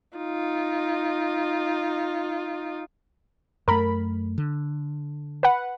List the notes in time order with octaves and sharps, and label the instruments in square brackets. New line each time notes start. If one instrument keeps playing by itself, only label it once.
[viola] D#4 F4
[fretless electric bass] F#2 A3 [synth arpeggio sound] A#4 B5
[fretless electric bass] D3
[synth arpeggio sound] B4 F#5